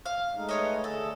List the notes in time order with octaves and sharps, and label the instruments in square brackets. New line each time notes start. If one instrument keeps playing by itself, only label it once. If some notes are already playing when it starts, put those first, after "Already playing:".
[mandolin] F5
[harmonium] G#3 A3 D#4
[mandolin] B3 C#5 D#5
[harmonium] D3 A3 G#4 [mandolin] A4